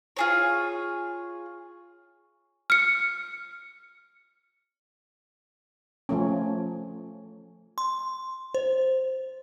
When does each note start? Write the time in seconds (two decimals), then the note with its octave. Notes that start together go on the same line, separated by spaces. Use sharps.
0.17 F4 G#4 C#5
2.70 F6 C#7
6.09 F3 A3 C#4
7.78 C6
8.55 C5